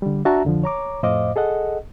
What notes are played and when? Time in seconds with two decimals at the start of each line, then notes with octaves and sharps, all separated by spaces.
0.02 D3 G3
0.25 D4 F#4 E5 A5 A#5
0.45 F2 D3 F3
0.64 C#5 A#5 D6
1.03 F2 A2 C5 D#5 F5 D6
1.36 G#4 A4 D#5 F#5